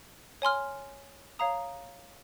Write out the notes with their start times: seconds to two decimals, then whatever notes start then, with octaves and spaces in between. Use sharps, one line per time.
0.42 C#5 G#5 C6 F6
1.39 C#5 F5 A#5 D#6